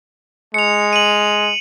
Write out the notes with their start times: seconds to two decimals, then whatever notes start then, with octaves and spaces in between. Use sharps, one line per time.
0.54 G#3 C#7 F7
0.93 D#7 F#7